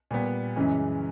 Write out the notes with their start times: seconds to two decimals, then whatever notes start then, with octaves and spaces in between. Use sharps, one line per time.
0.11 A#2 G3 B3
0.56 F#2 C#3 E3 G#3 C#4